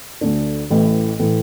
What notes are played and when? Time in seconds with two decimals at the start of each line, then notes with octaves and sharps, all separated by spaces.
0.21 D2 D3 A3 D4
0.70 A1 A2 E3
1.19 A2 E3